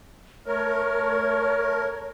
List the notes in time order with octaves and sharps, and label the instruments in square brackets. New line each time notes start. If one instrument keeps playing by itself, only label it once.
[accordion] A3 A#4 [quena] C#5